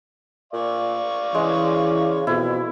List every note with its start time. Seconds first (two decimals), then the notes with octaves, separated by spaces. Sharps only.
0.53 A#2 D5 F5 C#6
1.35 C#3 E3 G#3
2.27 F2 B2 E4